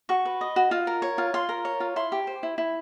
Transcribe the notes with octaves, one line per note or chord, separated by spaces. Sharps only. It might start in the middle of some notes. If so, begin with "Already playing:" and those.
F#4 C#6
B4
D#5
F#4
F4
A#4
C#5
F4
F4 C6
A#4
C#5
F4
E4 C6
G4
C5
E4
E4